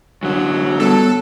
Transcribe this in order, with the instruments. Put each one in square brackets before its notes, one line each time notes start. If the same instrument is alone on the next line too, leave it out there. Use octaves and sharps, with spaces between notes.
[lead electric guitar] F#2 D3 [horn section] F#3
[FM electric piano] G3 B3 [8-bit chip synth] A4